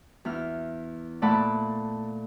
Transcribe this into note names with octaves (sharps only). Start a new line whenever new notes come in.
E2 E4 F6
A#2 A3 D5 F#5 A5 B5